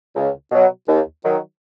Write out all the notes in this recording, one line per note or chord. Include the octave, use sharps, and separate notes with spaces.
C#2
B2 F#3
D#2
D#3 F#3